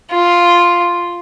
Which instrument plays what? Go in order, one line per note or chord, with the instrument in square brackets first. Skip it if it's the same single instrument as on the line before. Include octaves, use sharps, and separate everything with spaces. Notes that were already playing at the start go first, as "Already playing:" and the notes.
[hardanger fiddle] F4